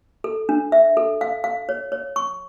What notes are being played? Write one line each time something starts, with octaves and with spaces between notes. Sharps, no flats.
A4
D4
E5
A4
F5
F5
C#5
C#5
C#6